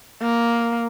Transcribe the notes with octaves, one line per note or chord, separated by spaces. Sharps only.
A#3